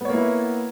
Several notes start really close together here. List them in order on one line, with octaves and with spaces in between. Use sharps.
B3 C#5 A#3 E4 B4